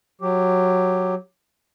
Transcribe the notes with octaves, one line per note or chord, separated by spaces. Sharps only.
F#3 G4